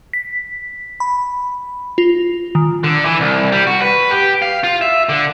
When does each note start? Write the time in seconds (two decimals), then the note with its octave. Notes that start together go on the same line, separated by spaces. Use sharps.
0.13 B6
1.00 B5
1.98 F4
2.55 D#3
2.84 D3
3.05 E3
3.20 C2
3.52 G3
3.67 F#4
3.82 B4
4.11 G4
4.42 F5
4.64 F4
4.82 E5
5.09 D3